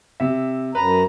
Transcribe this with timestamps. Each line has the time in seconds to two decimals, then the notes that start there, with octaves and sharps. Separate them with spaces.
0.20 C3 E5
0.75 F#2 B4 A#5